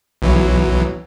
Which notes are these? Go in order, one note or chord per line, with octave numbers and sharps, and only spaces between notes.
B1 E3 F#3